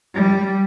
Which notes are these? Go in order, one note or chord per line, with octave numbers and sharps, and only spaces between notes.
G3